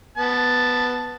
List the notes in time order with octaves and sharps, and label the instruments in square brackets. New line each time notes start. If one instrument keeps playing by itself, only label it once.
[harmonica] B3 A5